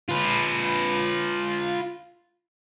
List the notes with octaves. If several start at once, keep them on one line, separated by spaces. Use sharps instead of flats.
F4 B4